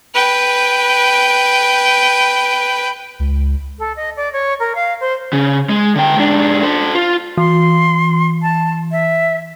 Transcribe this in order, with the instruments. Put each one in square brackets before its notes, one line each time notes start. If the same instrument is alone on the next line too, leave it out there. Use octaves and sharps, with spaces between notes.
[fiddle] B4 G5
[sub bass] C#2
[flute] A4
D#5
D5
C#5
A#4
F5
C5
[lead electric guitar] C#3
G#3
D3 G5
G#2 D4
A4 C5
F4
[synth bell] E3 [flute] C6
[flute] A5
E5